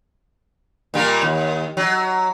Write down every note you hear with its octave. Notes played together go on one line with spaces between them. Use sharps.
A#2 G3 A#3
D#2
F#3